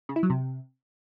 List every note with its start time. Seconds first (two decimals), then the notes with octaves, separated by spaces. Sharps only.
0.09 C#3
0.16 E4
0.23 F#3
0.30 C3